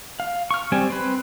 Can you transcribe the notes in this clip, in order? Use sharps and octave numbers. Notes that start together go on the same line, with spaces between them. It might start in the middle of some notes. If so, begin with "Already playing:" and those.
F5
C#6 F6
G3 C4 G4 G#5
C4 B4